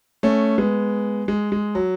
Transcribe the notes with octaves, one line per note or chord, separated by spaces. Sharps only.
A3 C#4
G#3 B3
G#3
G#3
F#3